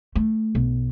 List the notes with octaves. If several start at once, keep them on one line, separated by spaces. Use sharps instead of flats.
A3
B1